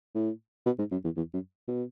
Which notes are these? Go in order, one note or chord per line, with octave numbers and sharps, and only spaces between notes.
A2
B2
G#2
F#2
E2
E2
F#2
B2